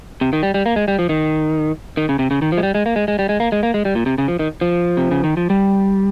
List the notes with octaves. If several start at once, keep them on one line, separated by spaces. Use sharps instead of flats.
C3
D#3
G3
G3
A#3
G#3
G3
F3
D#3
D#3
C#3
C3
C#3
D#3
F3
G#3
G3
G#3
A#3
G#3
G#3
G3
G#3
A#3
G#3
A#3
G#3
G3
A#2
C3
C#3
F3
D#3
F3
C3
C#3
D#3
F3
G3